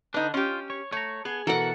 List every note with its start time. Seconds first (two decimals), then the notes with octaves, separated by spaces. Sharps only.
0.14 D3 D4 D#4 B4
0.34 C#4 F4 G4
0.70 C#5
0.92 A3 C#5 A#5
1.25 B3 G#4
1.47 B2 E3 F#4 A4 A#4 F#5